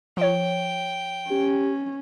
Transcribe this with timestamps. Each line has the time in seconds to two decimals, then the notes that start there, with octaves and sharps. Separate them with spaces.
0.17 F3 C#5 G5
1.30 C#4 G4